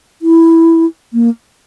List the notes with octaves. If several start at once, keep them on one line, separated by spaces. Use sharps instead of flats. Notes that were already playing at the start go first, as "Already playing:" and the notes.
E4
A#3